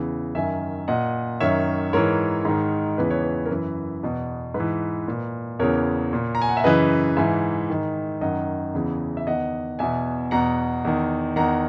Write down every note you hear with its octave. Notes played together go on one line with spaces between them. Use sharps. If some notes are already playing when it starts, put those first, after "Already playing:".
Already playing: E2 C#3 E3
F#2 D#3 E5 G#5
A#2 D#5 F#5
F#2 D#3 C#5 E5
G#2 E3 A#4 C#5
G#2 D#3
E2 C#3 E3 B4
C#5
B4
A#4
F#2 E3 B4
E2 B2
G#2 B4
E3
A#2
E2 C#3 E3 A#4 C#5
A#2
A#5
G#5
F#5
E5
F#2 C#3 E3 B4 D#5
G#2 E3 E5 G#5
G#2 D#3
F#2 D#3 D#5 F#5
E2 C#3 E3
E5
E2 D#3 D#5 F#5
E2 B2 E5 G#5
E2 B2 F#5 A#5
E2 D#3
E2 D#3 F#5 A#5